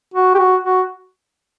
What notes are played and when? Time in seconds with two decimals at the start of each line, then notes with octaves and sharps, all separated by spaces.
0.14 F#4
0.35 G4
0.38 F#4
0.64 F#4